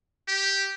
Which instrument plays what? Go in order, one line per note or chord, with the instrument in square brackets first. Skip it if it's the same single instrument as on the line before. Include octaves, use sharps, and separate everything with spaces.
[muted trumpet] G4